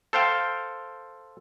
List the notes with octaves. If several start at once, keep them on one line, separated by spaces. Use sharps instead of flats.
A4 C5 F5 G5